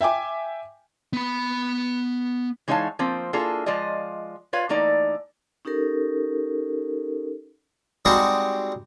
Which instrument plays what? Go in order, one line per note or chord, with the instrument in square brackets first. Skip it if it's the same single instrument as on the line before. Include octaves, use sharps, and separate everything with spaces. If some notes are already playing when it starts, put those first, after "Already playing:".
[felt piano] E5 G5 G#5 D6
[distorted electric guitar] B3 B5
[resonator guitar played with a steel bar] E3 G#3 D#4 C#5 F5 A5
F3 A#3 C4
A#3 D4 E4 F4 G#4 A4
F3 G#3 F4 D5 D#5
F4 B4 C#5 F5
E3 A3 A#3 D#4 D5 A#5
[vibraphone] C#4 D#4 G4 A4 A#4
[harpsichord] G3 G#3 C4 D#4 F#4